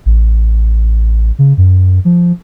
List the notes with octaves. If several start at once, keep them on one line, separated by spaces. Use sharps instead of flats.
A1
C#3
F#2
F3